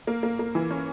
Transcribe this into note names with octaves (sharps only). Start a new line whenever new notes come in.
A#3
A#3
A#3
E3
C#4